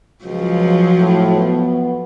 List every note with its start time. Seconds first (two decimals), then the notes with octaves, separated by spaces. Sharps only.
0.25 C#2 F3 F#3
0.98 A2
1.36 B3